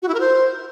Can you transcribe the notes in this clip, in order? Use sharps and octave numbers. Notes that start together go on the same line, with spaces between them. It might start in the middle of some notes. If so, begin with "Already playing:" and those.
F#4
E4
A#4
C5